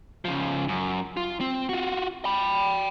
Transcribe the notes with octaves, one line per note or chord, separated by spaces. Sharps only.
C#3 F3
F#2
F4
C4
F4 F#4
G5 B5